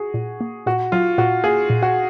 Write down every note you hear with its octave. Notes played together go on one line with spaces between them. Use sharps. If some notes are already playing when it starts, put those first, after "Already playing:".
Already playing: F#4 G#4
A#2
A#3
A#2 F#4
F#3 F4
A#2 F#4
A#3 G#4
A#2
F#4